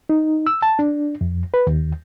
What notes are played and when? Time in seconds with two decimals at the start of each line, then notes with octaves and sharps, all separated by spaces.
0.09 D#4
0.47 E6
0.62 A5
0.79 D4
1.21 F2
1.54 B4
1.67 D#2